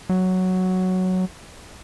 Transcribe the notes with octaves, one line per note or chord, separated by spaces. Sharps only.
F#3